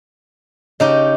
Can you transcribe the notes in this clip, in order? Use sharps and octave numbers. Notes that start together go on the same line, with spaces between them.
C#3 D#4 G4 D#5 A5